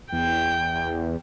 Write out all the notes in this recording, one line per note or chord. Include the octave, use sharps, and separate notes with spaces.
E2 G5